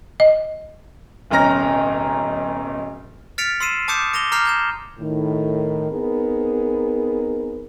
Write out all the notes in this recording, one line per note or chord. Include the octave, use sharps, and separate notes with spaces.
D#5
D1 B1 C#4 A#5 F6 A#6
F6 A6 B6 C#7 D7 F7
C6 E6 C7 D#7 E7
A5 D6 D#6 G6 C#7 E7
D6 A#6 F7 G7
A#5 D6 F6 G6 C7 F7
G6 G#6 E7
A2 D#3
B3 C4 D#4 G#4 A#4